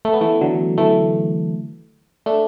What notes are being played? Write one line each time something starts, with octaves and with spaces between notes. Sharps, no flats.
A3
B3
E3 A3
D3 F#3
E3 A3
A3 D4